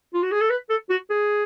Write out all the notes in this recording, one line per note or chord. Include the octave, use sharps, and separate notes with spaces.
F4
F#4
G#4
A4
B4
A4
F#4
G#4